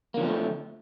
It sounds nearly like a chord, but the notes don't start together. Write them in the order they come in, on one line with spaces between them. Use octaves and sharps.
A#3 D3 F3 C4 A3